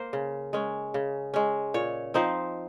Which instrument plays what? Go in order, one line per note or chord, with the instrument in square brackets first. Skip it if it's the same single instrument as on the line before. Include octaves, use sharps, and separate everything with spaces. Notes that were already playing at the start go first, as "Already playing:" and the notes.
Already playing: [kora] A#3 A#4 C5
C#3
G#3 C#4
C#3
G#3 C#4
A#2 C#5
F3 C4 D#4 C5